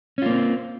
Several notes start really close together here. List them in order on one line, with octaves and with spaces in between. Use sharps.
C#4 F4 A#3 C4